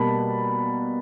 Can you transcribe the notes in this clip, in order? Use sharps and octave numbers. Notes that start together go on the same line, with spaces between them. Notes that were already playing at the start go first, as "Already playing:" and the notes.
Already playing: B2 G3 A#3 A5 B5